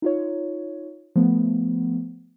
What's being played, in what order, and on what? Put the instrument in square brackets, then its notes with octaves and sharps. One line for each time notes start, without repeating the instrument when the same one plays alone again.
[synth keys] D#4 F4 C#5
F3 A3 B3